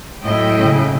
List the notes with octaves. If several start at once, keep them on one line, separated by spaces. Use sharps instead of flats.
A2 F#3 E4 D#5 G5
C#3